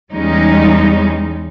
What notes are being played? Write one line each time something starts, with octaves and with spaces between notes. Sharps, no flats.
E2 G3 G#3 C#4 D#4